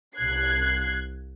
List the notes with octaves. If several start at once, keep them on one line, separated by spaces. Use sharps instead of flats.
C2 F#6 G#6 C7